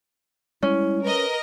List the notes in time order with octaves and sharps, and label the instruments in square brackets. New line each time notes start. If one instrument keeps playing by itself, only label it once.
[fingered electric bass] G3 G#3 [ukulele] C#4 [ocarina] E4
[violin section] A#4 D#5 [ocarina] B4